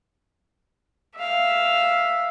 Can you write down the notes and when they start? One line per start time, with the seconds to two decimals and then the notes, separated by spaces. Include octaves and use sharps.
1.17 E5 F5